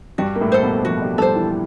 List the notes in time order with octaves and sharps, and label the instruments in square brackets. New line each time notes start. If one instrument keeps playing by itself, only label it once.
[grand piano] G2 G3 [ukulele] F#4
[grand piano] A#3
A2 A3
[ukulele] A4 C5
[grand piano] B2 B3
[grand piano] F3 F4 [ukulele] F#4
[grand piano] G3 G4
[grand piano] G3 G4 [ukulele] A4
[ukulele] C5
[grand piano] E3 E4